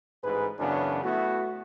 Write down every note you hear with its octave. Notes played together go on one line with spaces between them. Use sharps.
A1 G#2 G#4 B4
F#2 C#3 E3 B3 C#4 D4
A3 B3 E4 F#4